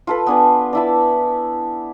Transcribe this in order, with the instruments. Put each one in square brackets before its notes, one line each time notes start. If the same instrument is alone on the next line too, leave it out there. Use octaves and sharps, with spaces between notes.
[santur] F4 A4 B4
B3 D4 G#5
D4 E4 A5